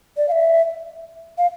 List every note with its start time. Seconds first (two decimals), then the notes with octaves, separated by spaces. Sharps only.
0.17 D5
0.29 F5
0.32 E5
1.38 F5